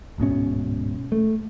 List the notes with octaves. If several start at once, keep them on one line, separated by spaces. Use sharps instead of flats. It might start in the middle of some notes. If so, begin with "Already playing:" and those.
D1 G#2 B2 C#4
A3